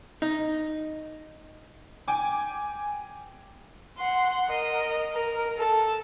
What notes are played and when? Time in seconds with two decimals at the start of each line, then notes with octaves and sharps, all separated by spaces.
0.22 D#4
2.08 G5 G#5 D6
3.98 F#5 C6
4.48 A#4 D#5
5.12 A#4
5.58 A4